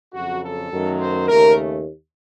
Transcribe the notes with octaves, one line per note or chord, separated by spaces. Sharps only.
F2 C#3 F#3 F#4
A4
F#2 D#3 F#3 A3
C5
D#2 C#3 A3 A#4